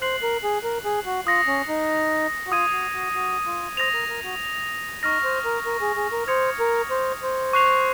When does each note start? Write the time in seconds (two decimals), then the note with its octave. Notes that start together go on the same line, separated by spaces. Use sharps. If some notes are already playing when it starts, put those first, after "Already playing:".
0.01 C5 F#6 C7 F#7
0.23 A#4
0.44 G#4
0.64 A#4
0.85 G#4
1.06 F#4
1.26 F4 D#6 A#6 C#7 F#7
1.47 C#4
1.68 D#4
2.47 F#4
2.52 F4 D#6 G#6 D#7
2.72 F#4
2.94 F#4
3.15 F#4
3.46 F4
3.77 C5 D#6 A#6 F7
3.93 A#4
4.09 A#4
4.24 F#4
5.03 D#4 C#6 F6 A#6
5.24 C5
5.45 A#4
5.66 A#4
5.81 G#4
5.96 G#4
6.12 A#4
6.28 C5 D#6 G#6 C#7 F7
6.60 A#4
6.91 C5
7.22 C5
7.53 C#6 F#6 C7 F7